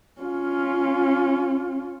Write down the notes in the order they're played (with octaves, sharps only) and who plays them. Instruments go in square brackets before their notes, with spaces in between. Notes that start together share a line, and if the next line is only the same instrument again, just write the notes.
[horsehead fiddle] C#4 F4